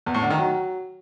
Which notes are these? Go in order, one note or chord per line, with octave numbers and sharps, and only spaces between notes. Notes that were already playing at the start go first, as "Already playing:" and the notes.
E2
A2
D3
D#3
F#3